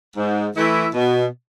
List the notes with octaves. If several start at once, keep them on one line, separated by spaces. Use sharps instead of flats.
G#2
E3 A3 E4
B2